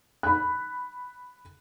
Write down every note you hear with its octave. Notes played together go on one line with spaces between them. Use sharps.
B5 F#6